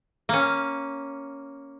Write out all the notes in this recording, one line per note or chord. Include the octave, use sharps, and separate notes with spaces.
A#3 C#4